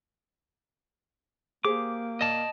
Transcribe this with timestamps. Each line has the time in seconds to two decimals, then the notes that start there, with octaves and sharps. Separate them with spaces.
1.65 A#3 G4 G#4 C5 D6
2.21 D5 D#5 A5